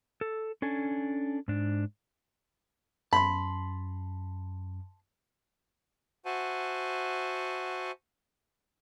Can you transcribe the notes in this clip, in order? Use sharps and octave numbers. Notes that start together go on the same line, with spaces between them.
A4
C#4 D4 A4 G#5
G#2 D4
F#2 A5 B5 C6
F#4 C5 E5 F#5 G#5 A5